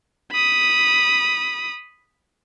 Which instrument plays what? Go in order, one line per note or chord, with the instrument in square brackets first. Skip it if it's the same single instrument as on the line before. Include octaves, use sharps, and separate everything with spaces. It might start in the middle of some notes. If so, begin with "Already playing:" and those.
[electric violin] B5 D#6